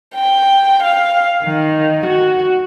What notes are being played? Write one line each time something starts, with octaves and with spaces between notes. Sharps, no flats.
G5
F5
D#3
F#4